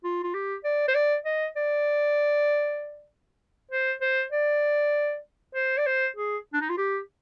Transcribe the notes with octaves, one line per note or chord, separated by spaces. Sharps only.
F4
F4
G4
D5
C5
D5
D#5
D5
C5
C5
D5
C5
D5
C5
G#4
D4
D#4
F4
G4